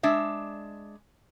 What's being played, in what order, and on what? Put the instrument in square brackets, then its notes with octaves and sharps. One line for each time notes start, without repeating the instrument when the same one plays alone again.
[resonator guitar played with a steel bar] G#3 D4 E5